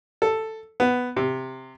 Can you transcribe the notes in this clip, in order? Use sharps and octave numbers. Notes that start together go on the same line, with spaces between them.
A4
B3
C3